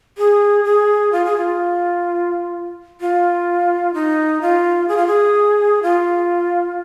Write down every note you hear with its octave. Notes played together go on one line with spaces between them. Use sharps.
G#4
G#4
F4
G#4
F4
F4
D#4
F4
G#4
F4
G#4
F4